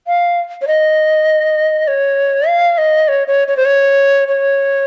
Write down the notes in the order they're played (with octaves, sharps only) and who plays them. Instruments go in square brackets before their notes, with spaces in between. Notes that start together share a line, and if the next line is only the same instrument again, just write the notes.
[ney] F5
C#5
D#5
C#5
F5
D#5
C#5
C#5
C#5
C5
C#5
C#5